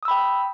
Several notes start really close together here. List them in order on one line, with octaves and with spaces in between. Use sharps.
D#6 E6 B5 G5